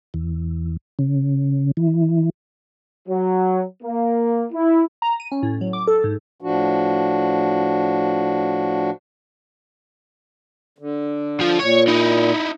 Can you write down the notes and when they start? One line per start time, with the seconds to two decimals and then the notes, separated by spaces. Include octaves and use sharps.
0.14 E2
0.99 C#3
1.77 E3
3.09 F#3
3.83 A#3
4.52 E4
5.02 A#5
5.20 D#7
5.32 C#4
5.43 A2
5.61 F#3
5.73 D6
5.87 A4
6.04 G#2
6.41 A2 F3 D4 F#4
10.78 D3
11.40 F3 F4
11.60 A#2 C#5
11.88 D#4 E4